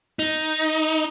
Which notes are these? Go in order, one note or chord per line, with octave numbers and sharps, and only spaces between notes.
D#4